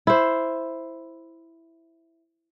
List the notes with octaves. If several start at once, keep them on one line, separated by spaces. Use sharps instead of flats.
E4 C5